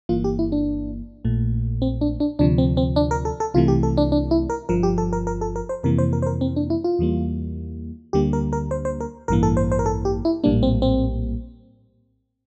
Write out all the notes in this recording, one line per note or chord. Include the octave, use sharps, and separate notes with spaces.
G1 G2 E3 A#3 F4
G4
E4
D4
A#1 A#2 A3
C4
D4
D4
D2 C3 F3 D4
C4
C4
D4
A#4
A4
A4
C2 C3 E3 A3 F4
G4
A4
D4
D4
E4
A#4
G1 G2 F3 A#4
G4
A4
A#4
A#4
A4
A#4
C5
F2 C3 E3 A#3 A#4
C5
A#4
C5
A#4
C4
D4
E4
F4
E2 E3 G3 A#3
D2 D3 G3 A#3 G4
A#4
A#4
C5
C5
A#4
A1 G2 E3 A#3 A#4
A4
C5
C5
A#4
A4
G4
E4
A#1 A2 G3 A#3 D4
C4
C4